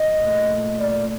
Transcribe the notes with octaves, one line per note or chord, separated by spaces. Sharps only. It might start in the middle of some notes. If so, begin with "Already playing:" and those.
Already playing: D#5
A#2 A3
D5